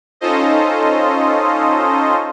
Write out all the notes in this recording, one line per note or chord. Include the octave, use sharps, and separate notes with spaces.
C#4 D#4 F4 A4 C5 D#5